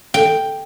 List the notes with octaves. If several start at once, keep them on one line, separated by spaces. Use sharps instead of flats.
G5